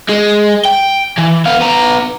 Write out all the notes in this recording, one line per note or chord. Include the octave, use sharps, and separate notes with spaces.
G#3
G5
E3
B3 F5
B3 A#5